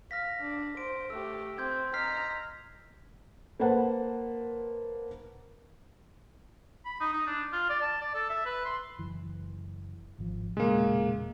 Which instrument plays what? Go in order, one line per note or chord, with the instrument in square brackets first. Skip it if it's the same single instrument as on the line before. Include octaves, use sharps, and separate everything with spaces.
[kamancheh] F5 [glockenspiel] F6 A#6 B6
[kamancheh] D4
[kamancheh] C5 [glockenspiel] D7
[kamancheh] A3 G4 [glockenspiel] E6
[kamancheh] C4 [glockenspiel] C6 G6 G#6
[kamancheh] D#5 A#5 [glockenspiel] F6 B6 C7
[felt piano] A#3 B4 C5 F#5 A5
[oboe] B5
D#4
D#4
D4
F4
D5
A5
D5
A4
E5
B4
C6
[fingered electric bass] F#1 E3
G#1 F3
[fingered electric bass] E1 A#2 C#3 [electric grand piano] G#3 A#3